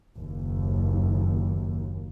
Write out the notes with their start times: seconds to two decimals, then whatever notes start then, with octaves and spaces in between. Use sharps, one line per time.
0.19 F#1 D#2